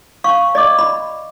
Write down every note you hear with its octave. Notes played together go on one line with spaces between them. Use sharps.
F5 C#6
D5 D#5 D6
B5